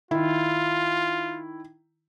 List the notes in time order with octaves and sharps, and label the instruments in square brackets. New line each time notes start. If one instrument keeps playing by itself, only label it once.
[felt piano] D#3 E4 [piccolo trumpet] F4